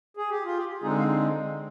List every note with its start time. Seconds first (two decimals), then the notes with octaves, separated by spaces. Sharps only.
0.17 G#4
0.30 G4
0.45 F4
0.57 G4
0.82 D3 G#3 C4 D#4 G#4
0.99 F5